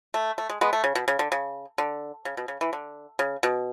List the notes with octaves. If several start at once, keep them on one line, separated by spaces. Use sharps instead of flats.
A3
A3
G#3
G#3 B3
A3
C#3
B2
C#3
D3
C#3
D3
C#3
B2
C#3
E3
D3
C#3
B2